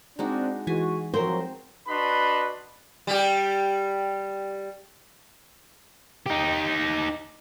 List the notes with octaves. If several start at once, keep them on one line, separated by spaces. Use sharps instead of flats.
G#3 C4 D4 D#4 F#4
E3 G#3 F#4 G#5
F3 F#3 C4 A#4 C5
D4 F#4 B4 D#5 B5 C6
G3 G4
D#4 G4